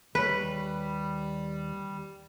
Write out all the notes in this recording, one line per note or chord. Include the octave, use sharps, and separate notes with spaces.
D#2 G3 B4 C#5